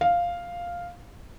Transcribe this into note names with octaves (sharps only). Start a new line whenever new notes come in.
F5